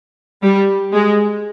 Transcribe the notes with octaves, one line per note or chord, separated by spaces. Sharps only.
G3
G#3